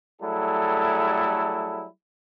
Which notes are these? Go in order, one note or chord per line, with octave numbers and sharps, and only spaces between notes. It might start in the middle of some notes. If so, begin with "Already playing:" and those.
F#3 G3 A3 E4 G#4 A4